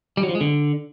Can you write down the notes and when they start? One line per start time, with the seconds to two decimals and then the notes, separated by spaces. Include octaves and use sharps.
0.17 G3
0.23 F#3
0.29 F3
0.35 G#3
0.41 D3